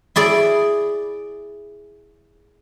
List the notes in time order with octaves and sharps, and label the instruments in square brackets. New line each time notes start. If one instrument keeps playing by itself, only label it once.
[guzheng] E4 G#4 D5